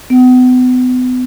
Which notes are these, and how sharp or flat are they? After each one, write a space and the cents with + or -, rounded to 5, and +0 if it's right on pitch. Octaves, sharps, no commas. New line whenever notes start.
B3 +35